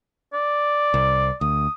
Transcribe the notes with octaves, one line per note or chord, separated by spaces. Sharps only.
D5
C2
D2 D#6